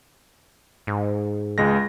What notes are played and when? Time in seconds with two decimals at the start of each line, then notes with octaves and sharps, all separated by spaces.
0.87 G#2
1.58 C#2 G#3 A#6